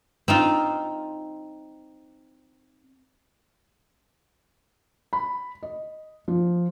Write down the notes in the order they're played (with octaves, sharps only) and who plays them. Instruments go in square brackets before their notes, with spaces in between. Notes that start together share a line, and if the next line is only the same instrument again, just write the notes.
[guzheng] C4 D#4 F4
[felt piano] B5
D#5
F3